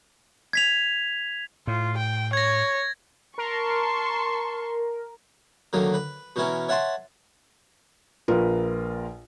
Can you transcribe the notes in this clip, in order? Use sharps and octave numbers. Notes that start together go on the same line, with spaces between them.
G#6 B6 F7
A2 F4
G5
C#5 G#6 A#6
A#4 A5 C6 C#6
D2 D#3 F#3 A#3
B4
B2 E3 C#4 E4 A#4
C#5 E5 F#5 A5 C6
A#1 F4 A#4 B4